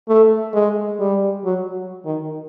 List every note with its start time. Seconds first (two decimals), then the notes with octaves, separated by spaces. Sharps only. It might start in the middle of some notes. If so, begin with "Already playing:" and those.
0.09 A3
0.54 G#3
1.00 G3
1.45 F#3
2.06 D#3